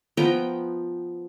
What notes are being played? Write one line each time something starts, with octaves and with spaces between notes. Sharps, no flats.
F3 B3 G5 A#5